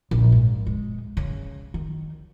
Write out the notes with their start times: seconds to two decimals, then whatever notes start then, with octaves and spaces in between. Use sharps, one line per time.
0.11 A#1
0.32 G#2
0.67 G#3
1.17 C#3
1.74 D#3